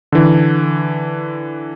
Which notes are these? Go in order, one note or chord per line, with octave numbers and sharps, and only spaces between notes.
D3 E3